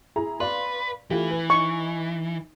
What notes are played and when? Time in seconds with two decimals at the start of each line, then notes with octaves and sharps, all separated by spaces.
0.16 E4 G#4 A#5
0.40 B4 D5 F5 C6
1.10 E3 A3 F4 G4
1.31 B4
1.50 D#4 C#6